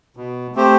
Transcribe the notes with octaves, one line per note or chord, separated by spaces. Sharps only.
B2
A3 C4 G4 C5